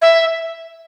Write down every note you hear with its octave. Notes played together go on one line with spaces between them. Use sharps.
E5